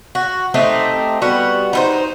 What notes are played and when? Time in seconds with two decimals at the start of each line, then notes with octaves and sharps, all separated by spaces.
0.15 F#4
0.54 A3 C4 D#4 G4
1.22 G3 B3 F#4
1.73 D#4 E4 C5